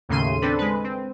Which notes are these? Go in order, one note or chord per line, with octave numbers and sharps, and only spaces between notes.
D#2 A2 C#3 C6 D#7
C4 D4 A4 B4
G#3 B4
C4